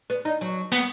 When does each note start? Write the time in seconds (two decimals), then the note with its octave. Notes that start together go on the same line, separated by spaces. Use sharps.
0.10 B3
0.25 D#4
0.41 F#3
0.72 B3